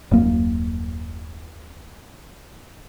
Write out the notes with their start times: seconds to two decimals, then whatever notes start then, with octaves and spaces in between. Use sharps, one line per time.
0.11 D#1 F#2 A#3